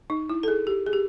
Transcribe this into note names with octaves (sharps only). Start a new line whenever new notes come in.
D#4
E4
A4
G#4
G4
G#4
G4